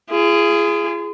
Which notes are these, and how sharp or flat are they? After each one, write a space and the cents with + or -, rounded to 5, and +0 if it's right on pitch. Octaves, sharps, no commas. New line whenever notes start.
F4 -45 G#4 +0